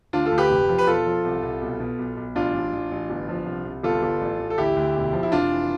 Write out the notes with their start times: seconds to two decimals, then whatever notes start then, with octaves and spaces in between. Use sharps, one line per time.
0.13 D2 D4 F4
0.25 F4 A4
0.32 D2
0.38 G4 B4
0.50 F1
0.69 F3
0.78 B4
0.87 E1 F4 A4
1.06 F3
1.25 C2
1.43 C2
1.61 B1
1.80 B2
1.99 B1
2.17 B1
2.36 A1 D4 F4
2.54 A1
2.73 A1
2.91 A1
3.10 G1
3.29 F3
3.46 C2
3.65 C2
3.83 G1 F4 A4
4.03 G1
4.21 A1
4.39 A1
4.50 A4
4.58 D2 E4 G4
4.76 D2
4.96 E1
5.13 F3
5.23 E4
5.32 F1 D4 F4
5.51 E3